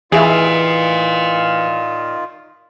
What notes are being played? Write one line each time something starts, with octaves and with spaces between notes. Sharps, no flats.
D#3 E3 F4 G#4 D5 E5 F5